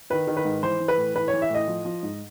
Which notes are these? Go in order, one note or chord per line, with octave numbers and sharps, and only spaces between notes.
D#3 B4
D#3
B4
G#2
E3 C5
E3
B4
A2
E3 B4
C#5
E3
E5
A2 D#5
F3
F3
G#2